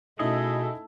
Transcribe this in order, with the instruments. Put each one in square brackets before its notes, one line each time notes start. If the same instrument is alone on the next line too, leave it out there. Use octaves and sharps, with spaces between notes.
[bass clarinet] B2 [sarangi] A3 [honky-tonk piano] C#4 D#4 E4 [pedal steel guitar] G#4 D#5